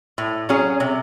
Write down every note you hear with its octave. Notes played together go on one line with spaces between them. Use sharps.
A2
F#3 C#4 G#4
C3